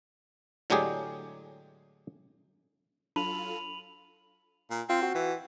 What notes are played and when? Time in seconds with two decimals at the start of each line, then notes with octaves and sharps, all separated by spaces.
0.70 A2 D3 F#3 G#3 G4 G#4
3.16 F#3 D4 F4 A4 B5 D#7 F7 F#7
4.70 A#2
4.89 C4 F4
5.03 F#4
5.15 E3